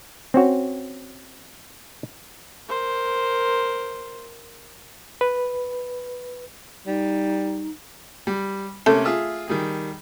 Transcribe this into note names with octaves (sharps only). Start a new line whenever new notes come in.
C4 C#4 F#4 C#5
A#4 C5
B4
G3 D#4
G3
C3 A3 A#3 C#4
F4 G#4 E5
D#3 G3 G#4